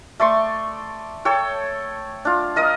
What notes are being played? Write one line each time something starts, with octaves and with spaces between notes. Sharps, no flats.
A3 D5 C6 C#6
A4 C#5 G5
D4 F4
A#4 D#5 F5 D#6